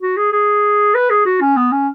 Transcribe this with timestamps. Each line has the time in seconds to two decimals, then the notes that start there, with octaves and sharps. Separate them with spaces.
0.01 F#4
0.17 G#4
0.32 G#4
0.94 B4
1.10 G#4
1.26 F#4
1.41 C#4
1.57 B3
1.72 C#4